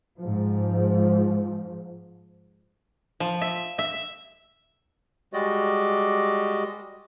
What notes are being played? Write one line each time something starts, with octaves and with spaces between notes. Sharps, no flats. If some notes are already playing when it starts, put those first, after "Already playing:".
G#2 F3
F3
E5
E5
G3 G#3 F#4 G4 D5 D#5